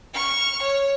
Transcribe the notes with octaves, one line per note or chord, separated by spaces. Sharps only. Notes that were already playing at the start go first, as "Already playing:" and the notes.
C#6 F6
C#5